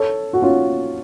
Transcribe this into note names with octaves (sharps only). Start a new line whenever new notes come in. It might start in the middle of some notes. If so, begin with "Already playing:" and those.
Already playing: A4 C#5
F#4
C#4 F4